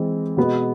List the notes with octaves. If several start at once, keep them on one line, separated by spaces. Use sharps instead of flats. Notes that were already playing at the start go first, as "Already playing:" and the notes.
Already playing: E3 G#3 C4
B2 G#3 B3